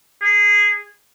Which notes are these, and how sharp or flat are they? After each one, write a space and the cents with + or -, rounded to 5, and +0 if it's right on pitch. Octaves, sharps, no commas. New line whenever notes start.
G#4 -15